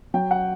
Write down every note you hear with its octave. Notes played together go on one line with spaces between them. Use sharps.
F#3 G5
F#5